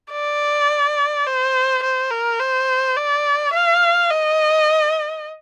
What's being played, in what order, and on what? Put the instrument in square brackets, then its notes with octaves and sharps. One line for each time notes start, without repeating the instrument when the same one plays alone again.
[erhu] D5
C5
C5
A#4
C5
D5
F5
D#5